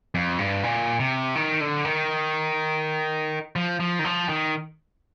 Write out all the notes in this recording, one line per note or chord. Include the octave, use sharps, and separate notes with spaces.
F2
G2
A#2
C3
D#3
D3
D#3
F3
F3
D#3
F3
D#3